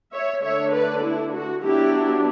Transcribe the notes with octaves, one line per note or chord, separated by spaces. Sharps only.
C#5 E5
D3 A3 D4 C#5 E5
B4 D5
E4
F#4
F#3 B3 D4 E4 G4